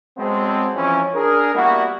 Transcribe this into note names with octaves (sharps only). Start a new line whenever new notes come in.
F#3 G#3 A3 B3 C4
F2 E3 C#4
D4 G#4 A#4
G3 A#3 B3 E4 F#4